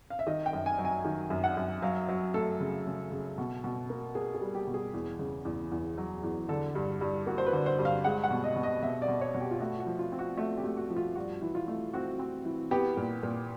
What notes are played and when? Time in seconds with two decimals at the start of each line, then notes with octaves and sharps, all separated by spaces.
0.10 F5
0.19 E5
0.27 D#3 D#5
0.46 G5
0.53 F#2
0.66 G#5
0.78 F#3
0.85 G#5
1.05 D#3
1.30 F#2
1.44 F#5
1.57 F#2
1.82 F#3 F5
2.09 F#3
2.34 A3 A4
2.60 C#3
2.86 C#3
3.12 C#3
3.38 B2
3.64 B2
3.90 A#3
4.15 A#3 G#4
4.35 G#4
4.41 G3
4.55 G4
4.67 B2
4.74 G#4
4.94 E2
5.19 C#3
5.45 E2
5.72 E2
5.98 F#3
6.23 E2
6.49 D3 A4
6.75 G2
7.01 G2
7.27 A#3 F#4
7.38 C5
7.46 B4
7.53 D3
7.66 C5
7.79 G2
7.85 F5
8.04 G#3 F#5
8.23 F#5
8.31 B2
8.44 D#5
8.56 B2
8.63 D#5
8.82 B2 E5
9.02 D5
9.08 B2
9.21 C#5
9.34 B2
9.41 G4
9.51 F4
9.60 A3 F#4
9.80 F#4
9.86 F3
9.99 F4
10.12 C4
10.19 F#4
10.38 A3 F#4
10.58 G4
10.64 A3
10.77 F#4
10.90 F3
10.96 F4
11.15 G2 F#4
11.42 E3
11.55 F4
11.68 A3
11.93 C4 F#4
12.19 C4
12.45 E3
12.71 B3 G4
12.97 A#2
13.23 A#2